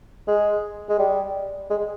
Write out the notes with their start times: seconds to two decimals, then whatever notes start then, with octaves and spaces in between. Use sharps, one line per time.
0.28 G#3
0.89 G#3
0.99 G3
1.70 G#3